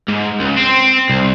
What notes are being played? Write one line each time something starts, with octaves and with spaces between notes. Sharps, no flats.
G#2
C#2
C4
C2